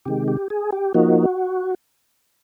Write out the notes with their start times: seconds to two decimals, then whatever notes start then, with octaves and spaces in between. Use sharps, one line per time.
0.05 C3 D#3 G#3 G4
0.28 G4
0.50 G#4
0.72 G4
0.94 F3 A#3 D#4 F#4